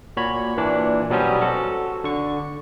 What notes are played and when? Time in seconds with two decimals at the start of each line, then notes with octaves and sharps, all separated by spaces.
0.17 A#2 F#4 C#5 B5
0.57 A#2 E3 D4
1.10 B2 F#3 G3 B3 C#4 C5
1.41 F#4 A4
2.04 D3 C#6